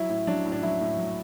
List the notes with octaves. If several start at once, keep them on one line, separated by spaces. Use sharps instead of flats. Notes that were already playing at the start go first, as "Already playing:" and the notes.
Already playing: F#3 E4
A2
F#3 D4
A2
D4
F#3 E4
A2
F#3